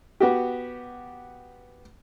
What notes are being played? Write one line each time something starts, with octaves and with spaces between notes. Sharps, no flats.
B3 F#4 G4